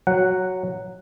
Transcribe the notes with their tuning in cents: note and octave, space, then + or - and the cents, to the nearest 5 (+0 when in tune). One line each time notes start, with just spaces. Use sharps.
F#3 +0 F#5 +0